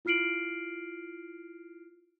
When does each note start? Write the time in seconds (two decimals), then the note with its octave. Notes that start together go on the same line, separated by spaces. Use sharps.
0.05 E4 F4 F6 C7 D7 F#7